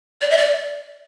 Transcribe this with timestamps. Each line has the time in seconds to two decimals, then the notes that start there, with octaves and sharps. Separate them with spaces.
0.21 D5
0.30 E5
0.37 D5